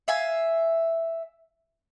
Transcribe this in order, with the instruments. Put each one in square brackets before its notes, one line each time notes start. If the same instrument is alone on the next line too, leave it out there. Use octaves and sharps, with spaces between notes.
[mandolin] E5 F5 G#5